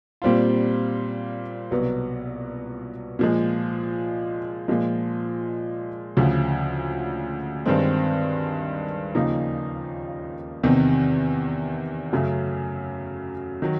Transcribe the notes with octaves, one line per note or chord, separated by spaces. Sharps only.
A#2 G3 C4 F4
C2 B2 F#3 B3
A#2 F3 G#3
A#2 F3 G#3
D2 C#3 F3
G2 D#3 G#3 C4
D#2 C#3 F3 A#3 D#4
E2 C3 D#3
F#2 C#3 F#3 A3
D#3 F#3